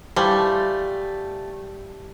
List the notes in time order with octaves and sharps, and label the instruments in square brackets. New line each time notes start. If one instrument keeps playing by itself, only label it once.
[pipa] E3 F3 A3 [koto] G3